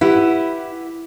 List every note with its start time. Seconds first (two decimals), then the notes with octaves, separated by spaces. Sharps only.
0.01 E4 G4 B4 F#5